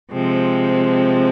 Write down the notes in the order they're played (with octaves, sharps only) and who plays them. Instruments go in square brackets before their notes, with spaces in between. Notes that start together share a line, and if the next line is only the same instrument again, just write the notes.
[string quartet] C3 F3 G#3 C4